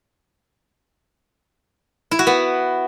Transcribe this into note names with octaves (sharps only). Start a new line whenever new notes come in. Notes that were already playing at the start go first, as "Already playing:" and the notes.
E4
F#4
B3